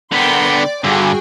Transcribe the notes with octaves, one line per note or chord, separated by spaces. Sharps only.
D3 B3 A#4 G5 C6
D5
G2 D3 F#4 G#4 G5